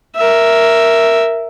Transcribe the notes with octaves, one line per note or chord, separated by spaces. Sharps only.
A#4 E5